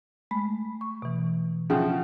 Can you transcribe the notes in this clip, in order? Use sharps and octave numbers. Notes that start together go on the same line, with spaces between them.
G#3 A3 B5
C#6
B2 E3
C#3 F3 E5 F#5 G5